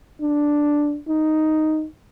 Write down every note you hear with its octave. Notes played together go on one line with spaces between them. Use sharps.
D4
D#4